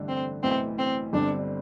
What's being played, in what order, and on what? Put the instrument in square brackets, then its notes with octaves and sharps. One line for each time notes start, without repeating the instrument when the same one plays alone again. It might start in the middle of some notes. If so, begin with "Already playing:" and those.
Already playing: [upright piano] A1 G2 D3 A3 D4
[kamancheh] C4
[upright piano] B1 A2 E3 B3 E4 [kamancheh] C4
[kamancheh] C4
[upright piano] G1 G2 D3 G3 C4 [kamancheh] D4